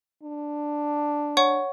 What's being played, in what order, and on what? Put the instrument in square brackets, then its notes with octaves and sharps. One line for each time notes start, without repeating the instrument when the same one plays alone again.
[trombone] D4
[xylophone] C#5 F#5 C#6